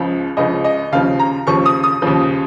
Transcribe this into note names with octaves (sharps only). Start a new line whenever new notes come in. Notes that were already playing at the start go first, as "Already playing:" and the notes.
Already playing: C#2 C#3 F3
C#2 C#3 F3 D#5
D#5
D#2 C#3 F3 F5
A#5
D#2 C#3 F3 C#6
D#6
D#6
D#2 C#3 F3